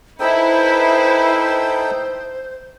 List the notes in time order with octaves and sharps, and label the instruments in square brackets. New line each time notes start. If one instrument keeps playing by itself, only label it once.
[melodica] D#4 A4 G5 [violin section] E4 B4 [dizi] C5